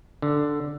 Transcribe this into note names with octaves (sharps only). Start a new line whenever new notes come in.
D3